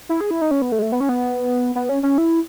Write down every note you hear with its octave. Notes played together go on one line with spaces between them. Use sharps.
E4
G#4
E4
D#4
C#4
B3
A3
G#3
A3
B3
C#4
B3
B3
C#4
C#4
E4